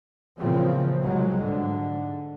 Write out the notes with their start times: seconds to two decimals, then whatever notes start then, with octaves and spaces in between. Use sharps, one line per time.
0.37 A#2 C#3 E3 F3 A#3 C4
1.03 C2 F#3 G#3
1.42 G#2 D3